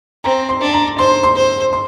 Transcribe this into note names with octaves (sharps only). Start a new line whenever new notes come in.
C4 A#5
C6
D4
A#5
C5 C6
C6
C5
C6